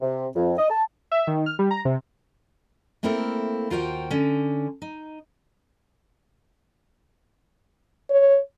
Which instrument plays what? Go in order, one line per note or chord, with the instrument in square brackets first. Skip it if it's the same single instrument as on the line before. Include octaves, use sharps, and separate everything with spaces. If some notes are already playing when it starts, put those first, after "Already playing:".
[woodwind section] C3
F2
D#5
A5
[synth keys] E5
D#3
F6
G3
A#5
C3
[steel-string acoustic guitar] A3 A#3 C4 E4 A4 A#4
D#2 F4 F#4 A#4 C5 G5
D3 C#4
D#4
[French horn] C#5